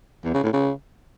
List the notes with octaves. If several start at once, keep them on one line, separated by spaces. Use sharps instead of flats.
E2
C#3
A2
C#3